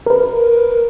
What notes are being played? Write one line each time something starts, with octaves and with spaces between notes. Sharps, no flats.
A#4 B4